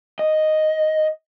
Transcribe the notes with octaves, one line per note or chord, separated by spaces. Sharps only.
D#5